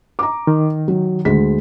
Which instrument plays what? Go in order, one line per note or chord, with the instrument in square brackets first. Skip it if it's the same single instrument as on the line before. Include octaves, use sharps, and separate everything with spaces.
[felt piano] A#5 D6
[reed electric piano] D#3
[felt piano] F#3
D2 G#3 B6